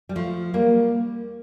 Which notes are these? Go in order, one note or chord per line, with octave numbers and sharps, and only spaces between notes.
G3
F3 A3
G3 A#3